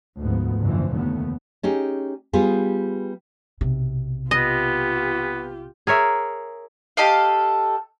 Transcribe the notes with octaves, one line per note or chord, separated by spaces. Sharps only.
D2 G#2 F3 B3
F#1 D#2 D3 E3 F3
F1 D#2 A3 B3
C#4 D#4 G4 G#4
G3 B3 F4 G4 G#4
B1 C3
B3 F4 G4 D#5
G#4 A#4 C#5 E5
G4 A4 D#5 F5